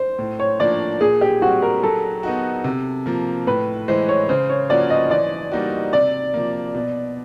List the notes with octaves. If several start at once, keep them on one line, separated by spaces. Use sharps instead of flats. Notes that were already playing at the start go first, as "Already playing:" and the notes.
Already playing: C5
A2
C#5
F3 A#3 D4 D5
A#2 G#4
G4
G3 C4 F#4
A#4
F#3 A4
B3 D#4 F#4
C3
F3 A#3
A2 B4
E3 G#3 C5
C#5
C#3 C5
C#5
F3 A#3 C#4 F#4 D5
D#5
E3 D5
G3 A#3 D#4 F#4
C3 D5
F3 A#3
B2